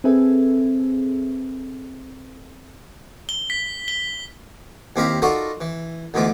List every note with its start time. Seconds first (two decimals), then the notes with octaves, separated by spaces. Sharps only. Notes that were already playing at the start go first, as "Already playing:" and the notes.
0.04 C4 G#4 A4 B4 E5 G#5
3.29 G7
3.50 B6
3.88 G7
4.96 D#2 C4 E4 G4 F5 A#5
5.22 D#4 F4 F#4 A4 A#4 D5
5.61 E3
6.14 D2 G#2 E3 B3 F4 D6